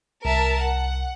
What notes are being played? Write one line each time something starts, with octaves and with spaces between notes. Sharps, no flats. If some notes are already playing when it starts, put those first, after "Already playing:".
C2 A#4 E5 A5
F#5